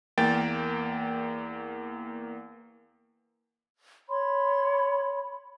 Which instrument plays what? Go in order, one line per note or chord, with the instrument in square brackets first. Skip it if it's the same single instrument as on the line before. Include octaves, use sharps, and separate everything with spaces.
[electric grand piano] E2 A#3 G5 A6
[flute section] C#5 B5 C6